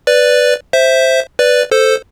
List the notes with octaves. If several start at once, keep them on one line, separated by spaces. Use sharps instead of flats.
B4 D5
C5 E5
B4 D5
A4 C5